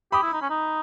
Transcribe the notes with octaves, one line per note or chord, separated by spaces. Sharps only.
G4 B5 D#6
E4
D#4
C#4
D#4